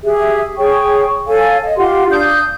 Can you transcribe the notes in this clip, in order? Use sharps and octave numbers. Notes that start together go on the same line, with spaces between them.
G4 G#4 E5
G#4 C#5 G5 C#6
A4 C#5 F5 G#5
D#5
F4 G4 F#5 C6
D4 F5 D#6 G6